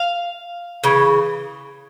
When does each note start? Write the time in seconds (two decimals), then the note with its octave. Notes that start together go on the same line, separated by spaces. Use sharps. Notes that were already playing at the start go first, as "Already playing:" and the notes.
Already playing: F5
0.84 C#3 E3